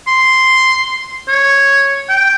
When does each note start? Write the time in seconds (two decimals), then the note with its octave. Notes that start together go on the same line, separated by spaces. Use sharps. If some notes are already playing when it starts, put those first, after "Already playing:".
0.07 C6
1.28 C#5
2.09 G5